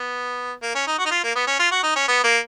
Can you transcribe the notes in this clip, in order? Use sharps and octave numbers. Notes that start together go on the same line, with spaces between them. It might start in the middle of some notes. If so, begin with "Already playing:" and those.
Already playing: B3
A#3
C#4
D#4
F#4
D#4
F4
A#3
B3
C#4
F4
F#4
D#4
C#4
B3
A#3